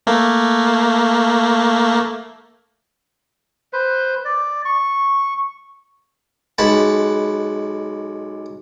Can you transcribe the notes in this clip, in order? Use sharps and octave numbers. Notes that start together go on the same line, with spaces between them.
A3 A#3
B4 C5
D5
C#6
B1 G#3 B4 F#5 A5